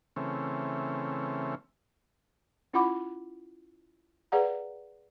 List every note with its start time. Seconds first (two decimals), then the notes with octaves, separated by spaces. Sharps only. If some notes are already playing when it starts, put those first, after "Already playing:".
0.16 C#3 E3 A3 C4 C#4
2.73 C#4 E4 F4 F#5 B5 D6
4.32 G#4 B4 D5 F5 F#5 A#5